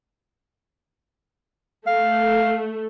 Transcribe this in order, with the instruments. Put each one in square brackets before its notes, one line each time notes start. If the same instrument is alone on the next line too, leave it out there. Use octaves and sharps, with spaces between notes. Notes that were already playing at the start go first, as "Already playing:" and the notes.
[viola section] A3 [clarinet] F5